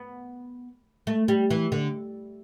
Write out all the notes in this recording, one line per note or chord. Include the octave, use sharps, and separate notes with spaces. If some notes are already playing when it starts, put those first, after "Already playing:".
Already playing: B3
A3
G3
E3
D3